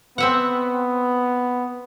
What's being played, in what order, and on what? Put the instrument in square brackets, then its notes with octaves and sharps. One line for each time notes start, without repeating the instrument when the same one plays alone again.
[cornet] B3 [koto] C4 E5 F#5